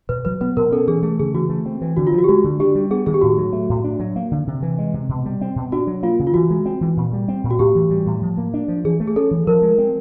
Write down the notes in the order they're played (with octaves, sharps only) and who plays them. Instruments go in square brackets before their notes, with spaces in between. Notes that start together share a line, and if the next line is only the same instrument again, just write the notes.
[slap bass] B2 [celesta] B4
[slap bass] F#3 [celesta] B4
[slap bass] B3 [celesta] B4
[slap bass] B2 [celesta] A#4
[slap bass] C#4 [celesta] A4
[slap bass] E3 [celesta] G#4
[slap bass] A3 [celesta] G#4
[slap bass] C#3 [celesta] G#4
[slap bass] E3 [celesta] F#4
[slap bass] A3
C4
E3
[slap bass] D3 [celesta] F#4
[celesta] F4
[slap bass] F3
[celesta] F#4
G4
[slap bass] G#3 [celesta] F#4
[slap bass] D3
[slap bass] D4 [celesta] G4
[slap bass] G3
[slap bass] B3 [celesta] G#4
[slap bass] D#3 [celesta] G#4
[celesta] G4
[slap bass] A2 [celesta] F#4
[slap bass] F#3
A3
A2
D4
F#3
A#3
D3
C3
E3
G#3
C3
B2
G3
C4
B2
[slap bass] D4 [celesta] F#4
[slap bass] F#3
[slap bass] A#3 [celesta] F4
[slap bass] C#3
[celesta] F4
[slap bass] E3 [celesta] F#4
[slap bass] G#3
C4
E3
A#2
G3
C4
A#2
[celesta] F#4
[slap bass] A2 [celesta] G4
[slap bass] E3
G3
A2
F3
A#3
D4
F3
[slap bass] E3 [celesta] G#4
[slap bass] A3
[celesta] G#4
[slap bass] C#4 [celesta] A4
[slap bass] E3
[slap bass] F3 [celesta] A#4
[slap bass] G#3
C4